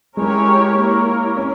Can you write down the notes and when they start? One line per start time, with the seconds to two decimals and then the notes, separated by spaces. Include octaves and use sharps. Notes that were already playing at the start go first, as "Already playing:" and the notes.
0.17 G#3 C#4 E4 G4 A#4 C#5
0.77 A#3 E4 A#4 C#5
1.37 C#4